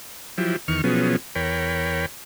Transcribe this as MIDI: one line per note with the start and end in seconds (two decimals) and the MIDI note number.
0.38 0.56 53
0.38 0.56 54
0.38 0.56 64
0.38 0.56 67
0.68 0.81 40
0.68 0.81 51
0.68 0.81 85
0.68 0.81 89
0.84 1.16 47
0.84 1.16 53
0.84 1.16 54
0.84 1.16 59
0.84 1.16 61
0.84 1.16 68
1.35 2.06 40
1.35 2.06 70
1.35 2.06 73
1.35 2.06 79
1.35 2.06 83